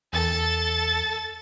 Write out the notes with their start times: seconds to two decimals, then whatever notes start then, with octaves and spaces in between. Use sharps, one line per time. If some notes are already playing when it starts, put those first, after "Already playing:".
0.13 E2 A4 A6